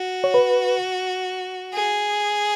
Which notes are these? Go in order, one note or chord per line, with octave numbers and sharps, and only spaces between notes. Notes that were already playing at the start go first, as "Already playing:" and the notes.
Already playing: F#4
C#5
B4
G#4